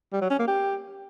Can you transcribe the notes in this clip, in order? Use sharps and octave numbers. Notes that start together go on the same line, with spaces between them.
G3
F#3
C#4
A#3
G4